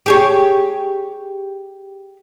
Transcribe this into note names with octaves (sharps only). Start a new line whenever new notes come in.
G4 G#4 C#5